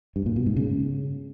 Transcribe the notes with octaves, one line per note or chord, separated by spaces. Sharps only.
G2
A#2
B2
G#2
C#3